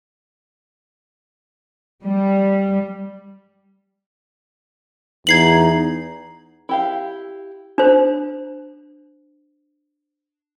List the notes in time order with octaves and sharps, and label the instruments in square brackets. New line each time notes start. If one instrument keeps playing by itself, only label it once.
[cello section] G3
[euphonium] E2 [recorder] D#4 [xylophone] G#6 C7 F#7
[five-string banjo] E4 G4 F5
[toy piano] D4 C5